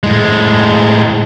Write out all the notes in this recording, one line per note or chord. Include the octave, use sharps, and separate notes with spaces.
A2 G#3